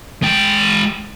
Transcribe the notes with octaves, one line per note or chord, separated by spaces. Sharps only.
G#3 G5